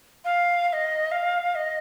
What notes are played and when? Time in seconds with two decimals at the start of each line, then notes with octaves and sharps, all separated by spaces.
0.24 F5
0.68 F5
0.73 D#5
1.11 F5
1.55 D#5